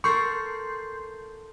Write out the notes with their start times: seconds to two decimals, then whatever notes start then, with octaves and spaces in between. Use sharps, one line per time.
0.04 A4 A#4 C6 C#6 G6 C7